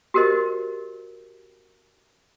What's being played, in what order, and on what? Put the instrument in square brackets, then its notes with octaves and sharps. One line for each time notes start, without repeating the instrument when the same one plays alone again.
[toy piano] F#4 G4 A#4 C5 D#5